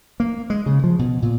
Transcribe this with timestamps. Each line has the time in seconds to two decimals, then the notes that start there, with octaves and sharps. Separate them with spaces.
0.20 A#3
0.50 G#3
0.66 C#3
0.84 F3
0.99 B2
1.22 A#2